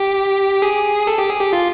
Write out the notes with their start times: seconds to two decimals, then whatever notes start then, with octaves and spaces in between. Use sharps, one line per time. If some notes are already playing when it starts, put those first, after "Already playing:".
Already playing: G4
0.62 G#4
1.07 A4
1.18 G4
1.30 G#4
1.41 G4
1.53 F4